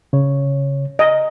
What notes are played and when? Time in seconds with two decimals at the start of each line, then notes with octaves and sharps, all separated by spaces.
0.13 C#3 C#5
0.99 D#5